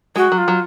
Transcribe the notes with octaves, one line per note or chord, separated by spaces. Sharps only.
G#3 F#4
F#3
F4
F#3